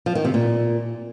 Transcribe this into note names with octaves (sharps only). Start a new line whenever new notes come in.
F3
D#3
C3
A#2